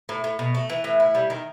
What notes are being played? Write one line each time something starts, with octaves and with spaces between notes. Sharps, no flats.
A2
A2
B2
A3
E3
A2
E4
G3
D#3